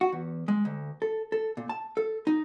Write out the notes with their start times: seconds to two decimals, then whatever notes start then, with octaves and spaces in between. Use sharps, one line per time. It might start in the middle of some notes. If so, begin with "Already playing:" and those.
0.01 F#4
0.12 E2
0.48 G#3
0.65 D2
1.02 A4
1.32 A4
1.57 A#2
1.69 A5
1.97 A4
2.27 D#4